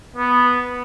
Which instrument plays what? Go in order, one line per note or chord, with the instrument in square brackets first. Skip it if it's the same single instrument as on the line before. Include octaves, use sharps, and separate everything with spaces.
[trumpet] B3